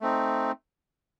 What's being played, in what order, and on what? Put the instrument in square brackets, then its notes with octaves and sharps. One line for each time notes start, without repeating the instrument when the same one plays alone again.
[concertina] A3 C4 D#4